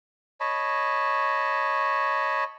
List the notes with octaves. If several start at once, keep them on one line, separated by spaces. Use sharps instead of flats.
C#5 D#5 A5 B5